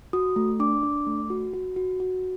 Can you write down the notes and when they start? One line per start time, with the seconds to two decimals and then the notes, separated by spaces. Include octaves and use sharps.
0.13 F#4 D#6
0.36 A3
0.60 D4 D6
0.83 D4
1.07 A3
1.30 F#4
1.54 F#4
1.76 F#4
2.00 F#4